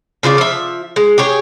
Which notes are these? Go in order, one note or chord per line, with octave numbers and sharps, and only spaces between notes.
C#3 F4 C5 D5
F3 E5
G#3
G4 G#4 C#5